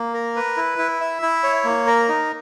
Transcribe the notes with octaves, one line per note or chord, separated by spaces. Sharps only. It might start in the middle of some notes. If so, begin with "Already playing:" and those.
Already playing: A#3
A#4
B4
E4
E4
E5
E4
C#5
A#3
A#4
D#4